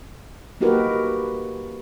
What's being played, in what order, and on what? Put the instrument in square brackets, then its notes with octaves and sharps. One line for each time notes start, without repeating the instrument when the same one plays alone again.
[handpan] A#3 D#4 F#4 G4 A#4 B4